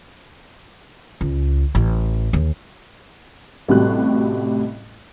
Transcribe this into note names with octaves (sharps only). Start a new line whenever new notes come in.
C#2
A1
D#2
A1 A2 C3 G3 F#4 F#6